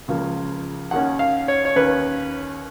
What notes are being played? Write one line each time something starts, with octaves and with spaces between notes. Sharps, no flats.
C#2 C#3 F3 A#3
D#2 D#3 A#3 C#4 F#5
F5
C#5
C#5
D#2 D#3 A#3 C#4 B4